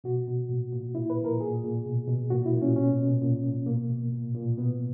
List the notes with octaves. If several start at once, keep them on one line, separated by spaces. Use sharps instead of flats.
B2 F#4
B2
A#2
A#2
A#2 E4
B4
A#2
A#4
A#2 G#4
A#2
B2
B2
A#2 F#4
E4
A#2
C#4
B2 C#4
B2
A#2
A#2
B2 A#3
B2
A#2
A#2
B2 B3